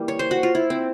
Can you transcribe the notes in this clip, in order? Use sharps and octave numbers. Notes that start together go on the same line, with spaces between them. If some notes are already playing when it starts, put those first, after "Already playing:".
Already playing: E3 G3 A#3
C#5
C5
F#4
F4
E4
C4